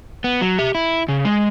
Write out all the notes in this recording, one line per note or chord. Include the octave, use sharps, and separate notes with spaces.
B3
F#3
G4 E5
E4
C#3
G#3